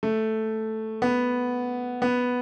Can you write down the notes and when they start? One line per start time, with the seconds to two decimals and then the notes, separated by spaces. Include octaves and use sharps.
0.03 A3
1.02 B3
2.02 B3